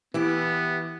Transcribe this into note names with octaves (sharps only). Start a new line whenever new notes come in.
E3 B3 E4 G4